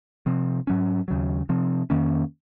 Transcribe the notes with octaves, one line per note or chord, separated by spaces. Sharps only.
C3 F3 C4
G#2 F#3 C#4
D#2 C#3 F#3
C3 F3 C4
F2 D#3 A#3 C#4